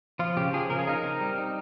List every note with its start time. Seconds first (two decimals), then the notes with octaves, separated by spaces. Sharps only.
0.19 F3 F4
0.37 C#3 G4
0.53 F3 G#4
0.70 C#3 A#4
0.79 G#4
0.88 D#4 A#4
1.04 C4
1.21 G3
1.38 D#4